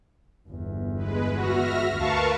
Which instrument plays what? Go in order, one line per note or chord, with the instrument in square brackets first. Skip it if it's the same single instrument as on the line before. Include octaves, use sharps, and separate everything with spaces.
[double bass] G1 E2
[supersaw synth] G#3 B4
[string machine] F#4 [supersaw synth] E5 F6 A#6
[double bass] D2 [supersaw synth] A#4 B4 [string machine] F5 A5 C#6